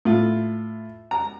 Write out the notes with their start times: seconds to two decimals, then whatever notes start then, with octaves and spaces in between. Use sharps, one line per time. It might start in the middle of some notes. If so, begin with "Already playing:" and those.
0.05 A2 F4
1.11 A#5